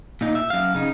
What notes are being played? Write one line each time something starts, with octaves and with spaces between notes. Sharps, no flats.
A#2 D#4
E5
F#2 F5
C#3 D#4